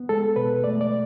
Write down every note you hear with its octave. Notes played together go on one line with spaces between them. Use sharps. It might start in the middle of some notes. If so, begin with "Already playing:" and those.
Already playing: B3
G#3 A4
B2 B4
A3 D5
D5